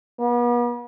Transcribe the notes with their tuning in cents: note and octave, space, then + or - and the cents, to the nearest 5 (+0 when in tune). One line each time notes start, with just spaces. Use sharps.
B3 -40